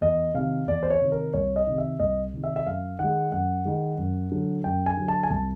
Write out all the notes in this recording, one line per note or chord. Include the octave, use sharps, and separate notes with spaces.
E2 D#5
C3 D#3 F5
E2 D5
C5
C#5
C3 D#3
A#4
C2 C#5
D#5
C3 D#3
E5
C2 D#5
C3 D#3
E5
E5
F#2 F5
D#3 G#3 F#5
F#2 F#5
D#3 G#3
F#2
D3 F#3
F#2 G5
G#5
D3 F#3
A5
G#5
C2 A5